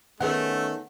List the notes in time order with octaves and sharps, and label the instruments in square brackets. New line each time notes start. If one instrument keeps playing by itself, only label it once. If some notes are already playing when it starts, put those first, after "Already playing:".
[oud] D#3 B3 G#4 [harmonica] A3 [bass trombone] C#4 [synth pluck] F#5